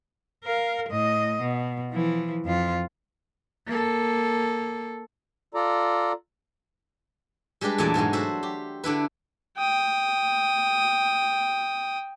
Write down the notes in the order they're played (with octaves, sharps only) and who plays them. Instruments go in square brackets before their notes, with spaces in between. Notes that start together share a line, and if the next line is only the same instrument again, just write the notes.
[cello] A#4 F5
A2 D#5
B2
E3 F3
F2 F4
A#3 A4
[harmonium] F4 A4 D5 A#5
[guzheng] G3 G#3 D4 G4 B4
E2 A#2 F#3 A3 G#5 A5
G#2 B2 F#3 G#3
F#4 A4 C5 E5
G4
D3 D4 E4 B4
[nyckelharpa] G5 D#6